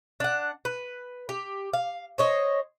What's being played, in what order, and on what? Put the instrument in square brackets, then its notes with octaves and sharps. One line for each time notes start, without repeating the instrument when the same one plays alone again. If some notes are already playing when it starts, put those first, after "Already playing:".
[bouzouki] D4 F#5
B4
G4
F5
C5 C#5 D#5